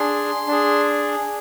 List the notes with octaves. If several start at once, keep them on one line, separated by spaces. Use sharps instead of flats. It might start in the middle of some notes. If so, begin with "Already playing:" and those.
Already playing: D4 G#4 C6
D4 G#4